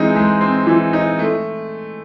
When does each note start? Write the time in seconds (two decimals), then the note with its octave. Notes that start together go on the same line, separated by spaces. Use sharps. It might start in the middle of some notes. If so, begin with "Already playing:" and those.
Already playing: E3 G#3 C4 D#4
0.16 G#3
0.41 C4
0.67 E3
0.93 D#4
1.19 A3